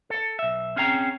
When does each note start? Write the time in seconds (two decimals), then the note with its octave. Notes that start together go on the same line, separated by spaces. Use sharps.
0.10 A4
0.39 B1 E5
0.76 C4 C#4 G#4 G5 A#5